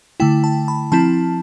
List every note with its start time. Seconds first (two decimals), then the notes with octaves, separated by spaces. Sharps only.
0.20 D3 A3 E4 G5
0.44 A5
0.68 B5
0.92 F3 C4 E4 A5